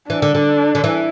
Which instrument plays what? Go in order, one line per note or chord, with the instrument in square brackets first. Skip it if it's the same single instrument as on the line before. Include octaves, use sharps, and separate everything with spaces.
[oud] E3 [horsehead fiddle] D4
[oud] D3
D3
D3
E3